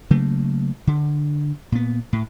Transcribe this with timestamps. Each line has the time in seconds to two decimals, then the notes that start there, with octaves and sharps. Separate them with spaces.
0.10 C#3 F#3 A3 A#3
0.87 D3
1.72 A#2 B3
2.13 A2